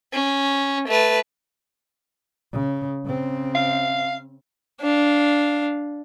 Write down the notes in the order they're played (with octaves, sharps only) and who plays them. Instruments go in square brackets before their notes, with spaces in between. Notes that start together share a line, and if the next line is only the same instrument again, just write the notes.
[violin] C#4
A3 B4
[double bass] C#3
C#3 C4
[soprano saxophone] F5
[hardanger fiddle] D4 F5